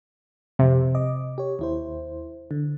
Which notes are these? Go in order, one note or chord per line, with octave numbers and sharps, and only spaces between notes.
F2 C3
D#5 D6
G4 C#5
D#2 E4 C5
D3